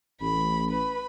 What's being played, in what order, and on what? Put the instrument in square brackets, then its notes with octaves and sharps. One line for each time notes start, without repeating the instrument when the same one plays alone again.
[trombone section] A1 [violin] B5
[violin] B4 B5